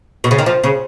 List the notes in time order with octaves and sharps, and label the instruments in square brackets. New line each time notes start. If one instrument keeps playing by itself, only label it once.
[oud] B2
C#3
D#3
F3
C#3